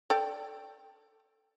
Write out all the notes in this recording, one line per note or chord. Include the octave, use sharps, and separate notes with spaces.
A4 D5 G5